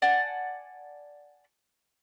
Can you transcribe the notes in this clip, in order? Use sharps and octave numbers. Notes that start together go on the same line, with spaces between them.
D5 F#5 G#5 A5